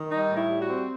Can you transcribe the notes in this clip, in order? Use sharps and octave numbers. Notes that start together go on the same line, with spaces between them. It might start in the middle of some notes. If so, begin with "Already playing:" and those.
Already playing: D#3
G3 D#4
A2
E4
G3
F#4
C4